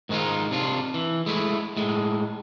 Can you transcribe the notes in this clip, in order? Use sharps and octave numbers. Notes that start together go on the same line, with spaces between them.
G#2 D#3 G#3 D#4 F4
C3 D4 F4
E3
G#3 A3 E4
A2 G#3